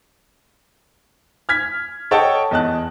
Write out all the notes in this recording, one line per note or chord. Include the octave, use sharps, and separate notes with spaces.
F6 G#6 B6
A4 C#5 D#5 F#5 G5 A5
E2 D#5 A5 F#6